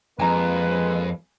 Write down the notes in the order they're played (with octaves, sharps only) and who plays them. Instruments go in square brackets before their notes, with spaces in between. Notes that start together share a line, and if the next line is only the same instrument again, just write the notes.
[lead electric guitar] F2 [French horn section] G#3 A#3 B4 [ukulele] G#5 A#5